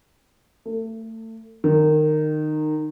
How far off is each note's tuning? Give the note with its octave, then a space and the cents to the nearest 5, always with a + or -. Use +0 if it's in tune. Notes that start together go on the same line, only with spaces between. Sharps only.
A3 +30
D#3 -20